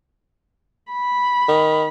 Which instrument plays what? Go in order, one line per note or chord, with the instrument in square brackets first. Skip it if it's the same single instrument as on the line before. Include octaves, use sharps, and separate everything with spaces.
[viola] B5
[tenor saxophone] D#3